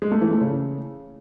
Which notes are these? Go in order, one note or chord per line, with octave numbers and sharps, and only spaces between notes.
G#3
A3
E3
A3
C#3